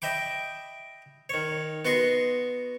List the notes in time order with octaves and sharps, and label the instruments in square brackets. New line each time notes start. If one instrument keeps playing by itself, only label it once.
[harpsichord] D#5 E5 G5 B5 D6
D#3 C#5
B3 F#4 D#5 C6 C#6